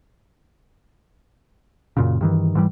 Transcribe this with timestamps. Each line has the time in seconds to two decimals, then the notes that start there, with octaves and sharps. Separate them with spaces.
1.97 F#2 A#2 C#3
2.21 G2 D#3 E3
2.55 G#2 E3 G3